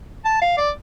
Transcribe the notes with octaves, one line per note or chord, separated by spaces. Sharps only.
A5
F5
D5